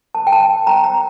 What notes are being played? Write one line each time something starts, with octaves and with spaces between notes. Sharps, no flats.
A5
G5
A5
A#5
A#5